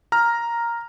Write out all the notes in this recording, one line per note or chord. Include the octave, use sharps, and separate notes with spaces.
A#5 F6